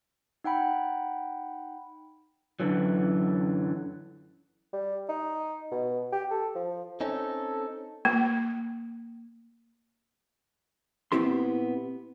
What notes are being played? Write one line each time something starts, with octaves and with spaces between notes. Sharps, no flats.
D#4 F#5 G5 B5
F#2 D3 E3 F#3
G3
D#4
B2
G4
A4
F3
C4 C#4 D#4 A4
A#3
A#2 B3 C4 E4 G4 C6